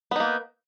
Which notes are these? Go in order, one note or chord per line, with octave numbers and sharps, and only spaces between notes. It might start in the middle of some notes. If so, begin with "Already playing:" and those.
A#3 B3 D#4